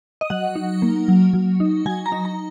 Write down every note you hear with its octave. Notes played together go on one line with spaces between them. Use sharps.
D#5
F#3 F#5
D#4
A#3
F#3
F#3
D#4
F#3 G#5
A#5
D#4
A#5